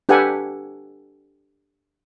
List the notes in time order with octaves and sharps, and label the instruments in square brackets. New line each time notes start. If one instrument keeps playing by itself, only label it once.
[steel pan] D4 G4 A4 B4 F#5 G#5